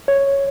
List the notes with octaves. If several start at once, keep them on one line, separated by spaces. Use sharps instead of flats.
C#5